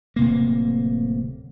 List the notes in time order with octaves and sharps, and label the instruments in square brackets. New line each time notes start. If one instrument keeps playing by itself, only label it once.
[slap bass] D1 C3 A#3